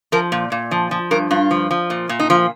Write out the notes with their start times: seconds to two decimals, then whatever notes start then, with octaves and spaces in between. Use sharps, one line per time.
0.12 F3 A#4
0.32 A#2
0.52 A#2
0.71 F3
0.91 F3
1.11 G2 A#4
1.31 G2 F4
1.51 F3
1.71 F3
1.90 A#2
2.09 A#2
2.20 D#4
2.30 F3 F4